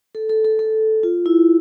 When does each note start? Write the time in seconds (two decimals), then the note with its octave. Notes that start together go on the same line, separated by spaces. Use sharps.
0.15 A4
0.29 A4
0.45 A4
0.59 A4
1.03 F4
1.26 E4